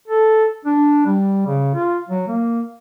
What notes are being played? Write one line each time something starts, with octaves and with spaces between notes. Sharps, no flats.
A4
D4
G3
C#3
F4
F#3
A#3